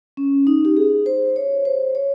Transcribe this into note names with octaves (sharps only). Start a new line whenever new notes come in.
C#4
D#4
G4
G#4
C5
C#5
C5
C#5